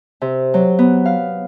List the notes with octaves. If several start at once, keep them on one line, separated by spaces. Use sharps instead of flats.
C3
F#3
B3
F5